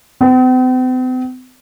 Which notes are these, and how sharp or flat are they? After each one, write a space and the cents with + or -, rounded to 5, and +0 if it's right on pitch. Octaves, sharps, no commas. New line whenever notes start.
C4 -45